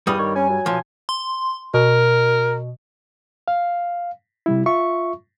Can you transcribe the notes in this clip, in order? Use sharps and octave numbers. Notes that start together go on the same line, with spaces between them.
E2 G2 G3 D#6
D#3 C#5
C#4 G#5
F#3
B1 F3
C6
B2 A#4
F5
C3 G3 E4
F4 E5 C#6